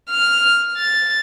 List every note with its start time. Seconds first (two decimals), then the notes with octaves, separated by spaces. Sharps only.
0.10 F6
0.78 A6